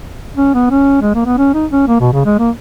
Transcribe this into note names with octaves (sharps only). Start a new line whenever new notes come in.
C#4
B3
C#4
G#3
A#3
B3
C#4
D#4
C#4
A#3
B2
C#3
G#3
A#3